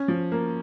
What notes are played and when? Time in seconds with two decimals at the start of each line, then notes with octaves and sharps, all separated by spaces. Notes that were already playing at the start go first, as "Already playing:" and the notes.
Already playing: C#4
0.08 F3
0.32 A#3